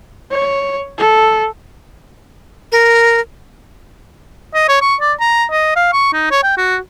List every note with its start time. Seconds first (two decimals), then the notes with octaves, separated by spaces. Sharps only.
0.31 C#5
0.98 A4
2.72 A#4
4.54 D#5
4.68 C#5
4.82 C#6
5.00 D5
5.20 A#5
5.50 D#5
5.76 F5
5.93 C#6
6.13 D#4
6.31 C#5
6.43 G5
6.57 F#4